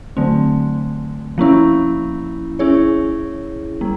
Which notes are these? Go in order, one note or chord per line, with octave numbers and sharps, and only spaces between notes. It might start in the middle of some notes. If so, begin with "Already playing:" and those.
D3 F#3 A3 C4
F3 A#3 C#4 E4
C#4 E4 G#4 C#5
G3 A#3